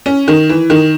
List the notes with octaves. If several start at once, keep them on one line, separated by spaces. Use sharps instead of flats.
C#4
D#3
E3
D#3